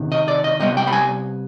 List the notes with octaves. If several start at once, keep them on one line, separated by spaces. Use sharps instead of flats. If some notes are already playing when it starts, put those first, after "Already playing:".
Already playing: C3 D#3 B3
D#5
D5
D#5
C3 G3 B3 D#5
G5
B5
G#5